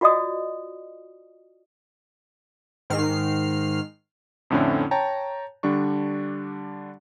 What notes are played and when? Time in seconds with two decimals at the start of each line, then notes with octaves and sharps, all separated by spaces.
0.01 F4 F#4 D5 D#5 D#6
2.90 G#2 D#3 F6 C7
4.50 F2 A2 D3 C4 C#4 E4
4.91 C#5 G5 A5 A#5
5.63 D3 G3 D4 C#6